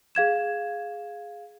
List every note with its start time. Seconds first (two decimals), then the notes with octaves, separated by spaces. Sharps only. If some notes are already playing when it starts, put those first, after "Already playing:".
0.15 G#4 F5 G#6 E7